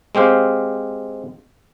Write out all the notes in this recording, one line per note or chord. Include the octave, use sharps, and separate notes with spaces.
G#3 C4 G4 F5